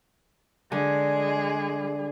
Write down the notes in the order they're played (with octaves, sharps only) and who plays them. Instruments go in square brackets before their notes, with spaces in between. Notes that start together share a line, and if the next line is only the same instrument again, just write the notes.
[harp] D3 [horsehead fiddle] G#3 G#4